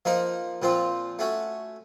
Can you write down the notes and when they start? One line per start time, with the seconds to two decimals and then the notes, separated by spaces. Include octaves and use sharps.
0.05 F3 A#3 D#4 A#4
0.62 A#2 F3 C4 F4
1.19 A3 C#4 F#4